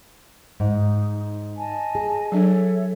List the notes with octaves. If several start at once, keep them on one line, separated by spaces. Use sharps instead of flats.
G#2 D#4
D#5 G#5 A5
G#4
F#3 D4 A4 C#5 E5